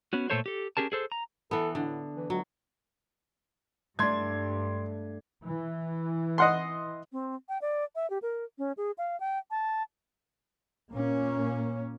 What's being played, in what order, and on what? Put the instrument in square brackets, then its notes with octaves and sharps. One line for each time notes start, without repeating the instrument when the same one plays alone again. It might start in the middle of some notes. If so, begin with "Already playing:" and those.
[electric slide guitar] B3 C#4 F#4
A#2 A3 B3 A4 C5 C#5
G4 A4
C#4 G4 G#4 A#4 A5
G#4 A4 C5
A#5
[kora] E3 B3 [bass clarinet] A4
[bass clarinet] A2 [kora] D3
[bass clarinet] E3
[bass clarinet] C#2 [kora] F#3
[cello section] G2 [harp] A3 D4 [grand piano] C6 G#6
[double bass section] E3
[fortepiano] D#5 F#5 C6
[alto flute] C4
G5
D5
E5
G4
A#4
C#4
G#4
F5
G5
A5
[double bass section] A#2 A#3 C#4